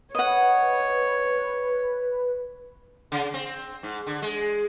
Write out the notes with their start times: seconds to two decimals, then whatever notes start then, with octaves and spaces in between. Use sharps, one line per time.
0.15 B4 C#5 D#5 F#5
3.12 C#3
3.34 C4
3.83 G#2
4.07 D3
4.22 G#3